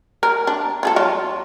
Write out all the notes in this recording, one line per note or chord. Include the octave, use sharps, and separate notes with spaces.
A#4
D4
F4 G#4 A4
F#3 F4